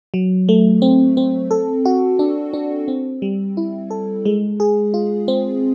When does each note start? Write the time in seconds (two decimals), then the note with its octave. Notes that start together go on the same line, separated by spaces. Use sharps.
0.14 F#3
0.49 A3
0.82 C4
1.17 C4
1.51 A4
1.85 F#4
2.19 D4
2.53 D4
2.88 C4
3.22 G3
3.57 E4
3.91 A4
4.25 G#3
4.60 G#4
4.94 F4
5.28 C4